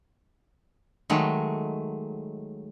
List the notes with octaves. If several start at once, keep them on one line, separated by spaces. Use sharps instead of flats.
D#3 F#3 G#3 A3